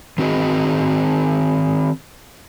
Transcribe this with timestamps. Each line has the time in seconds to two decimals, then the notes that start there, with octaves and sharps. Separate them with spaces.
0.18 D#3 C4 F#4 G#4 D#5